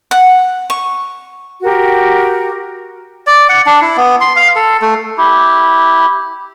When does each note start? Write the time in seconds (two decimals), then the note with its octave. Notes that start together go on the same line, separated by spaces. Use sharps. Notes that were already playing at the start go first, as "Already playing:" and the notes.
0.11 F#5
0.70 C#6
1.62 F#4 G4 A#4
3.27 D5
3.49 F#5
3.66 D4
3.81 E4
3.97 B3
4.21 C6
4.36 F5
4.56 A4
4.82 A3
5.18 E4 G4